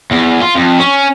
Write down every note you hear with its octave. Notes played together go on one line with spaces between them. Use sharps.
E2
F4
F2
C#4